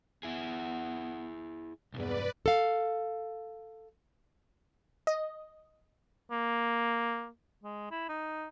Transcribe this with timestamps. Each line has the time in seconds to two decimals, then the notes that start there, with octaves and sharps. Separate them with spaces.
0.23 B3 E4 G#4
1.94 B1 E2 G2 B4 D5
2.46 A4 F5
5.07 D#5
6.31 A#3
7.63 G#3
7.91 E4
8.09 D#4